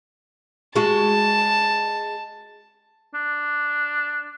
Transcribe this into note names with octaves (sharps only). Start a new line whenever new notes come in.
G#3 F#4 A5
D4